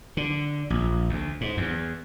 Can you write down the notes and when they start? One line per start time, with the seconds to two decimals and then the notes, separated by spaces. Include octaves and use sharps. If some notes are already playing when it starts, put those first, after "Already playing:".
0.17 D3
0.70 A#1
1.09 D2
1.41 G#2
1.57 E2